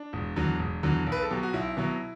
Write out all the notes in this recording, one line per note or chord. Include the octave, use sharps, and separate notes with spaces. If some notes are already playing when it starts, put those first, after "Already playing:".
Already playing: D4
E1
E2 D3 F#3
E1
E2 D3 F#3
B1
B4
A4
B2 F#3 G4
F#4
B1 E4
B2 F#3